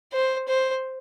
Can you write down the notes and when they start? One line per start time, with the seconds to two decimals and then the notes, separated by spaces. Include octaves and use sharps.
0.12 C5
0.48 C5